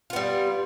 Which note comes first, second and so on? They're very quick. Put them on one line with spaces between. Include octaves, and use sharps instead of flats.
F4 B3 G3